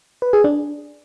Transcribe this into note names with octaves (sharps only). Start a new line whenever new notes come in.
B4
G#4
D4